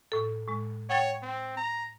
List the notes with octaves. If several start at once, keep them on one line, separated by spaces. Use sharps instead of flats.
A2 A4
A2 G#3
C#5 F#5 G5 A6
C4
A#5